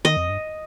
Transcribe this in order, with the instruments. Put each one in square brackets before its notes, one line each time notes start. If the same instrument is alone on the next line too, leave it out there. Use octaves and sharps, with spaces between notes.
[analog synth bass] D#3 [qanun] D#5
[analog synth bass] F2
G2